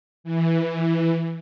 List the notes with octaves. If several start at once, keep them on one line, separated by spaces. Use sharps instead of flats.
E3